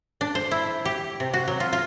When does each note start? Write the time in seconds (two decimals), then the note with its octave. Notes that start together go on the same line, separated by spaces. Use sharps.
0.21 D4
0.35 C5
0.51 E4
0.85 G4
1.20 C3
1.34 F#4
1.48 F#3
1.60 F4
1.73 F4